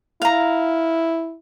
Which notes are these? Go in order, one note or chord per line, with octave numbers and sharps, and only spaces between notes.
E4 F5 A#5